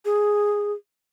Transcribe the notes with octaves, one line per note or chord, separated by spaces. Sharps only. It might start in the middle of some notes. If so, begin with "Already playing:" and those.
G#4